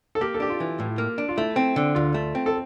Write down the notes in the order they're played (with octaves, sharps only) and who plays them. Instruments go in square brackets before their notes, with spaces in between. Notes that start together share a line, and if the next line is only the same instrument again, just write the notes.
[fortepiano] A4
[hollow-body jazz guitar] A#3 [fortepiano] G4
[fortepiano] A4
[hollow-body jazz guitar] D4 [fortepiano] G4
[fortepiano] F4
[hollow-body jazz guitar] E3
A2
A#3
D4
[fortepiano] F4
[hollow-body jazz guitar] A3 [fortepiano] E4
[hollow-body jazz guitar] C4
D3
[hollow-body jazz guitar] D2 [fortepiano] F4
[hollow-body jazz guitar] A3
C4
[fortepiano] A4